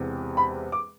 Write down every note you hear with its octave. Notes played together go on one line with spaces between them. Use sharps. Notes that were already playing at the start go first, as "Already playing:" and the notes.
Already playing: E1 E2 C3
B5
D6